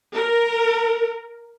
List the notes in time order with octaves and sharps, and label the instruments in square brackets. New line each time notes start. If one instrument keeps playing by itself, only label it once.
[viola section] A#4